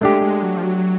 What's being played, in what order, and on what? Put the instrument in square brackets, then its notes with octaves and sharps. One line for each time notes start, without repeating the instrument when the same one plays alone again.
[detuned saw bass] G#3 [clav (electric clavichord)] A3 D4 G4
[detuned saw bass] G#3
F#3
F3
F#3